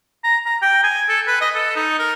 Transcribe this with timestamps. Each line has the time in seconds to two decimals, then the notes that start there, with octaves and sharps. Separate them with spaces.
0.24 A#5
0.46 A#5
0.62 G5
0.84 G#5
1.09 A4
1.27 B4
1.41 D#5
1.55 A4
1.76 D#4
1.99 A#4